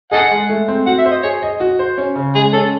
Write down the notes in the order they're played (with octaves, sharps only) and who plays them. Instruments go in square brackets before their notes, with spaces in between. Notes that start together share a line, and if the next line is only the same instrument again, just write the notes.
[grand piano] G#4 [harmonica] A4 D#5 F#5
[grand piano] G#3
A3
C4
[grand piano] F#4 [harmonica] F#5
[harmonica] E5
[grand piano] C5
[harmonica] D#5
[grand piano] G#4 [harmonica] C#5
[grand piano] D#5
F#4
C5
C#4
C#3
[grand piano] G#3 [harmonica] G#4
[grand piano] C#4 [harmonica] A4